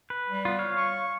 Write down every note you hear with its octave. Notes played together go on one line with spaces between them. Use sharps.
B4
G3
B3 F4
C#5 F5
C#6